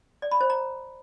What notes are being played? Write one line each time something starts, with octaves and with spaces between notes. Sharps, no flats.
D5
B5
C5
A#5